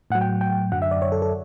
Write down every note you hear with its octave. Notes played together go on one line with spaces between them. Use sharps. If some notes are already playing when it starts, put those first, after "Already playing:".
A2 F#3 F#5
G5
G5
F#2 D3 F#3 F#5
E5
D5
C#5
A4
A4